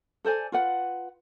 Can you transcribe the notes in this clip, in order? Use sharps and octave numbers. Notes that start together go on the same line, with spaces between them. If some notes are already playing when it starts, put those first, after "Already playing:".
A4 C5 D5 G#5
F4 B4 F#5